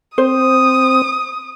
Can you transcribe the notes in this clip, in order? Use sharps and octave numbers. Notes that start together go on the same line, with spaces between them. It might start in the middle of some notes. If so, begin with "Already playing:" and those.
C4 C5 D#6